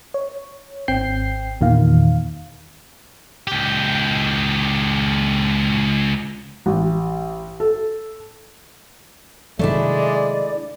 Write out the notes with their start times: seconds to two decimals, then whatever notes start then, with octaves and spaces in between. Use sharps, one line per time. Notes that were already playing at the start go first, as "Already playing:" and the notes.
0.14 C#5
0.88 G#1 C4 G5 G6 C7
1.61 E2 A#2 D#3 F5
3.47 C#2 G4
6.66 A1
7.60 A4
9.59 C3 D#3 F#3 G#3 A3 D4 E4 D5